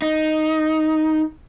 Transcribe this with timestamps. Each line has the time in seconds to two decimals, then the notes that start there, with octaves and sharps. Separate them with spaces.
0.02 D#4